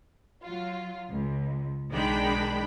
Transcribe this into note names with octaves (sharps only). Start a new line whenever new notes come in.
F#3 F4
C#2
B1 D#3 G#3 D4 G5 B5